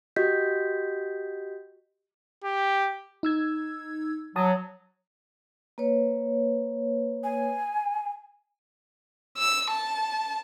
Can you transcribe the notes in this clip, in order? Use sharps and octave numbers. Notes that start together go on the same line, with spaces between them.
F#4 G4 D#5 G6 B6
G4
D#4 E6 G#6
F#3 A5 D#6
A#3 B4 C#5
G#5
E6
A5